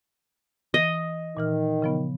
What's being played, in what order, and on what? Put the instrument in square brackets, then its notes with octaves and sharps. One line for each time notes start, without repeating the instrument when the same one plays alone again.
[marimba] E3 [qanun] D#5
[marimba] A#2 E3 F6 [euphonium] D#3
[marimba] C#3 F3 B3